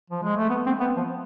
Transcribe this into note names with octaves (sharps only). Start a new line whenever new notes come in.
F3
G#3
A3
B3
C4
B3
F3